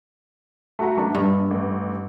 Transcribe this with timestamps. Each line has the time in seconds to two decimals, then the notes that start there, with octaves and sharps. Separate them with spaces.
0.79 A3 F#4 A#5
0.97 A1 A3 D4
1.15 A#1 G2
1.51 A1